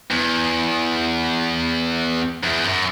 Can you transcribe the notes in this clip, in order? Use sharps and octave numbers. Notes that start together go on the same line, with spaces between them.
E2
E2
F#2